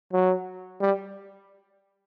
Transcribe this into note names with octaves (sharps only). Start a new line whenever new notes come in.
F#3
G3